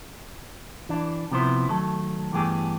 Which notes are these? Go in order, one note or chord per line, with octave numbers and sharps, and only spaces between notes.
E3 D4
C3 F3 B3 E4 C5
D#3 F#3 A3 A4
G2 E3 A3 B3 G4 G#4